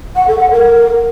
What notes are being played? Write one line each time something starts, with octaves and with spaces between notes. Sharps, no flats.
F#5
A4
F#5
A#4